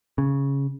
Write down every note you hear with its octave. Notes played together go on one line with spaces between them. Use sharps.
C#3